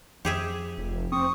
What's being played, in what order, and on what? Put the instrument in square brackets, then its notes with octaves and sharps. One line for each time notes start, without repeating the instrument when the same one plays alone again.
[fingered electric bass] F2 [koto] G4 G#4 E5
[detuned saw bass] F1
[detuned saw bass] C4 [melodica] C#6 D#6